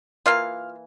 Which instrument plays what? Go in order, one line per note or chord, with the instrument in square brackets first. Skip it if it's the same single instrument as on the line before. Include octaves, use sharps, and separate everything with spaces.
[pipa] E3 A#3 F4 F5